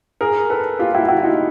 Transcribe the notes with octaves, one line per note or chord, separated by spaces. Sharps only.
G#4 A#4
A4 B4
F4 G4
E4 F#4
E4 F#4
D#4 F4